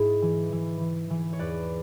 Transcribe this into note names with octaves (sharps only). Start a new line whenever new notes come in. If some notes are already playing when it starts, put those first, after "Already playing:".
Already playing: G#2 E4 G#4
E3
E3
E3
E3
C#5
E2 B4 D5